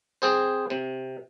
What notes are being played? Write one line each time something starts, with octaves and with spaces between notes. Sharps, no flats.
C4 G#4 C5
C3